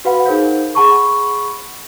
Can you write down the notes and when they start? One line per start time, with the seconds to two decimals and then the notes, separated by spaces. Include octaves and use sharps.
0.05 F#4 B4 F5 F#5 B5
0.25 D#4 G#4 A#4 C5 F5 G6
0.75 G#4 F#5 A5 B5 C#6